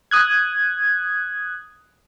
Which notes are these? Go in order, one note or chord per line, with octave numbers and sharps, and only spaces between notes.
D#6 F#6 G#6